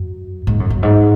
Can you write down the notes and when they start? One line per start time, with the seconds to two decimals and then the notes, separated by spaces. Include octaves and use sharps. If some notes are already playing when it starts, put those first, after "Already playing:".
Already playing: F#2
0.47 G#2
0.60 F#2
0.70 F#2
0.83 G#2